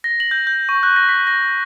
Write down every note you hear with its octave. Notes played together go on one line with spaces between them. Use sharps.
A#6
F#7
G6
G6
C#6
F#6
A#6
B6
A#6